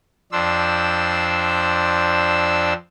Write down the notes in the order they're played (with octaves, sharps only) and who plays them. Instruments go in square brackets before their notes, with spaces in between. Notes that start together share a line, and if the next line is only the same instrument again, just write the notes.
[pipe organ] F2 D4 C5 E6